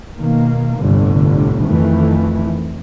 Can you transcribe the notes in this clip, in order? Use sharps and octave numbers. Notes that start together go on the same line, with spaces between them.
B2 D#3 A#3
G1 C2 A2 D3
F2 D#3 E3 A3